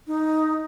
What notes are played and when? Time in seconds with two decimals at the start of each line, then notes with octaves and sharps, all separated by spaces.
0.07 D#4